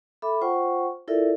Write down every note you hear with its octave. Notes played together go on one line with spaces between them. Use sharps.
A4 E5 B5 D6
F4 C5 F#5 G5 C#6
E4 F4 A4 A#4 D5 E5